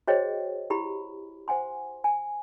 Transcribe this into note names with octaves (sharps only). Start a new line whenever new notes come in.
F#4 G#4 C5 C#5 D#5 G5
E4 G4 B5
C5 F#5 G#5 C6
G#5